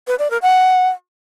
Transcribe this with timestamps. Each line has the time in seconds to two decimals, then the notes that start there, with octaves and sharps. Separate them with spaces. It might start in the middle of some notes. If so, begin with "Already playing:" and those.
0.07 B4
0.19 D5
0.30 A#4
0.42 F#5